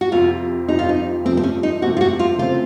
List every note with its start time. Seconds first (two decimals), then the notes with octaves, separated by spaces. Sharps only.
0.01 F#4
0.12 F2 C3 F3 F4
0.68 F2 C3 F3 D#4
0.79 F4
0.89 D#4
1.25 C3 F3 A3 C4
1.37 C4
1.43 C#4
1.63 D#4
1.82 C3 F3 A3 F#4
1.97 F4
2.01 F#4
2.19 F4
2.38 C#3 A3 C4 F4